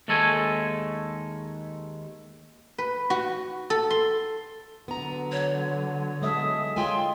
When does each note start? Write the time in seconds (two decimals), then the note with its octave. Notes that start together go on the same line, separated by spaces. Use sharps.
0.08 D#2 D#3 G#3 A3 A4 G#5
2.78 B4
3.10 F#4
3.70 A4
3.90 C6
4.88 D3 F#3 B3 A#5
5.32 C#5
6.22 G#3 A4 E5 D#6
6.76 G#3 F4 C#5 G5 G#5 C6